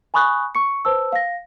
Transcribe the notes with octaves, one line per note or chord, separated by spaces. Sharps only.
G#5 B5 C#6 D#6 F#6
C#6 C#7
B4 C5 A5 E6
F5 A#6